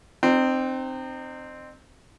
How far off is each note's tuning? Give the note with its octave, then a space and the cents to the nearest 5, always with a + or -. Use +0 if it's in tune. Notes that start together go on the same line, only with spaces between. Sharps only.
C4 +0 D#4 -35